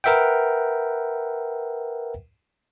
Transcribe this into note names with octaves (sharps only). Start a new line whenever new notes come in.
A#4 B4 E5 F#5 G5